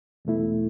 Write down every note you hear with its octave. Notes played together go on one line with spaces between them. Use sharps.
E2 B2 A3 E4